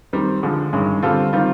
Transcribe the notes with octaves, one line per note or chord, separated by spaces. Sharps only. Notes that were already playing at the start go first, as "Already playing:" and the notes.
D#3 G3 C4
D3 F3 G#3
G2 D#3 G#3 C#4
D3 G3 C4 F4 A4
D#3 G3 C4 F4